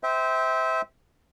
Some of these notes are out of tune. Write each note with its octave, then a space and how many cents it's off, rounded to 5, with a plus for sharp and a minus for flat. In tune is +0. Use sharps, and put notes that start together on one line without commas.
C5 -15 E5 -25 G5 +0